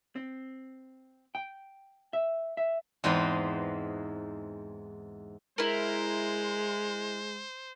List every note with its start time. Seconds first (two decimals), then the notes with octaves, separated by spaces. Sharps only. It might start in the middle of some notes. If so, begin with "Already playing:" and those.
0.16 C4
1.35 G5
2.13 E5
2.57 E5
3.04 E2 G#2 G#3 C4 D#4 B4
5.58 G#3 E4 A#4 C5